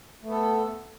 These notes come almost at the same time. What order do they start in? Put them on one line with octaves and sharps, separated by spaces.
A3 B3 A4